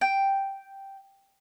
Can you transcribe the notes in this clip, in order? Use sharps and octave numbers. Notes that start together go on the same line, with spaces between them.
G5